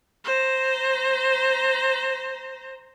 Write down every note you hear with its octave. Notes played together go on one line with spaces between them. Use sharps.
C5 A#5